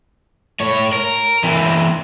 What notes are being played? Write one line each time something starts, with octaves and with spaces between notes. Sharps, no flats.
A2 C#5
A#4
E3 C4